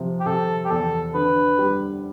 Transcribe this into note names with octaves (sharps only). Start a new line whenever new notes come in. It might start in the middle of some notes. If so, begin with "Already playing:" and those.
Already playing: C3 F3
G4
C3 A4
G4
E2 A4
D3 B4
G3